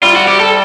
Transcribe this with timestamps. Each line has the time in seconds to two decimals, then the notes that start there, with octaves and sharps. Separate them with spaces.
0.03 G3 F4
0.16 F#4
0.28 G4
0.40 A4